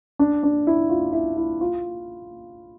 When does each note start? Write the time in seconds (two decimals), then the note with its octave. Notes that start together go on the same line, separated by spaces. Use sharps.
0.19 D4
0.43 D4
0.67 E4
0.90 F4
1.13 E4
1.37 E4
1.61 F4